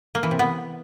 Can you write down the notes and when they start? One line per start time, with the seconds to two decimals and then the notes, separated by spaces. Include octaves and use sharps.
0.15 A#3
0.23 E3
0.31 C3
0.39 B3